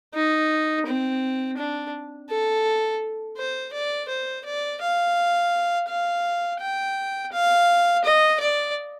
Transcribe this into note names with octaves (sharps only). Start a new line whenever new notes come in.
D#4
C4
D4
A4
C5
D5
C5
D5
F5
F5
G5
F5
D#5
D5